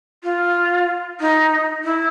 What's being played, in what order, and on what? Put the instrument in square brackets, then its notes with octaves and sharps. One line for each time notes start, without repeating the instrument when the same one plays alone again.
[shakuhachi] F4
D#4
E4